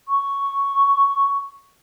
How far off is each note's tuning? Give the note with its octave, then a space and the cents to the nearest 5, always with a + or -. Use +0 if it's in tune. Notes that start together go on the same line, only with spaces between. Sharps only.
C#6 +0